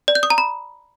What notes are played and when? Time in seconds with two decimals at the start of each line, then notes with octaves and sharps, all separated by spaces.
0.08 D5
0.15 G6
0.23 D#6
0.30 A#5
0.38 B5